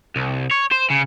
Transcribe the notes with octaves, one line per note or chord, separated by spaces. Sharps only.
C2
C#5
C5
C#3